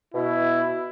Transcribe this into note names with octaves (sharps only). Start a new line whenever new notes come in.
B2 E4